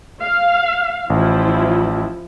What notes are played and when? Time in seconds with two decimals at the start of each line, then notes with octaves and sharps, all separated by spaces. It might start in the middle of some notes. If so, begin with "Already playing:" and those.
0.22 F5
1.10 A1 F3 E4